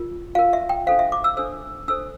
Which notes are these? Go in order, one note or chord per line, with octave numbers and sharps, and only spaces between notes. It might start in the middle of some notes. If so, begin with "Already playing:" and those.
Already playing: F4 A#4
F4 A#4 F5
E5
G5
D4 A4 C5 F5
E5
D6
E6
D4 A4 C5 E6
D4 A4 C5 E6